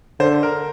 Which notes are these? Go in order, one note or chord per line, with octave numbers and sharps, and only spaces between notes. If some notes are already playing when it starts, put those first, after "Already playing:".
D3 C5
A#4